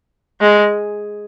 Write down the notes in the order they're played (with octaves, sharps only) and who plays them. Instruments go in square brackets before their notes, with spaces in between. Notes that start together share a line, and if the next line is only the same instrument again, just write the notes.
[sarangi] G#3